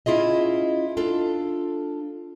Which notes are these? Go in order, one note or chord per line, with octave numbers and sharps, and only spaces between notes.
C#4 E4 F4 G#4 D#5
D4 F4 A4